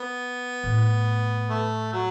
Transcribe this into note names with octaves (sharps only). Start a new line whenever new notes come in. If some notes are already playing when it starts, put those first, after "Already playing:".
Already playing: B3
A2
A3
F#3